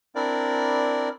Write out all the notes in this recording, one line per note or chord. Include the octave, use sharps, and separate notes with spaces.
C4 D4 E4 A#4 D5